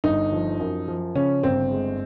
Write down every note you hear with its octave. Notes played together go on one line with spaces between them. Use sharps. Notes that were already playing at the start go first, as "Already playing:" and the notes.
G1 D#4
F3
F#2
F3
C#3 C#4
G1 C4
G#3